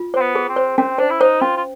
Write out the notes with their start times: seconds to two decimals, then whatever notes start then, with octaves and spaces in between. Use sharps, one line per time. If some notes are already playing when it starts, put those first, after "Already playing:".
Already playing: F4
0.14 C4 C5
0.21 B3
0.35 G#4
0.49 C4
0.56 C5
0.78 C4 C#4
0.98 D4 C5
1.10 E4
1.20 D#4 C5
1.41 C#4 F4
1.57 F4